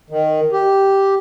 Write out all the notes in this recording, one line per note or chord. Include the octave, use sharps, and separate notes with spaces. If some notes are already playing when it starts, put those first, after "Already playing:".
D#3
G4